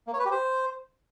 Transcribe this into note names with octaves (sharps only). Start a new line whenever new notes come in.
A#3
C#5
B4
G4
C5